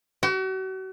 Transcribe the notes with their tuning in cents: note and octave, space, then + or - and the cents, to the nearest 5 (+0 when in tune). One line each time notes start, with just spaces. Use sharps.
F#4 +40